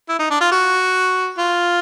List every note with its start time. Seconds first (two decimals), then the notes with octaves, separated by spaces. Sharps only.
0.08 E4
0.19 D#4
0.30 D4
0.41 F4
0.52 F#4
1.38 F4